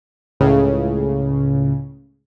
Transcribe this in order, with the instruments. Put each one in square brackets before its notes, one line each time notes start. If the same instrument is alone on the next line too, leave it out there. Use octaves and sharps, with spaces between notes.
[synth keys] C#2 A2 C#3